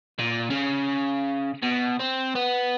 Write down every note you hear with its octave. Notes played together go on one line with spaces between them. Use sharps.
A#2
C#3
B2
C4
B3